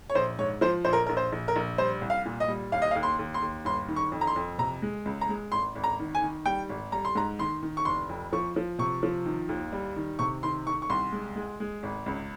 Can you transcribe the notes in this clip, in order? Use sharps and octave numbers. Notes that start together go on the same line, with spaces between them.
C#5
A#1 C5
G#2 C#5
F3 C5
A#1 C5
A#4
A#4
A#1
C5
A#1
A#4
A#1
G3 C5
C2
F5
A#2
D#5
G3
D#2 F5
D#5
F5
D#2
C6
D#2
C6
D#2
G1 C6
D#3
C#6
F2
A#5
C6
F2
C3 A#5
G#3
C#2
A#5
G#3
G#1 C6
G#1
A#5
D#3
G#5
D#3
G3 G5
G#1
G3 A#5
C6
G#2 A#5
D#3 C6
D#3
C#6
F1 C6
F2
F3 C#6
F3
C3 C#6
F3
D#3
D#2
G3
D#3
C3 C#6
D#3 C6
D#3 C#6
C#6
C2 C6
G#3
G#3
G#3
G#1
C#2